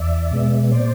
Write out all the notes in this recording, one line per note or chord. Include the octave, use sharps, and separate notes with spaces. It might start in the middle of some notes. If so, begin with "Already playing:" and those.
Already playing: E2 D5 E5
B2 G#3 B3
A#2 C5 D5